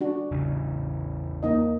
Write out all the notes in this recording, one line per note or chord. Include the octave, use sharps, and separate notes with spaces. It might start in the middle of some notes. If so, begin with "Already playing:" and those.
D4 F#4
E2 C#3 E3
A#3 D#4 D#5